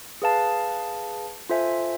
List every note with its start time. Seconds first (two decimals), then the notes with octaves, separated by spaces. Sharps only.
0.22 G#4 B4 F5 A5
1.49 F4 A4 C5 E5 G#5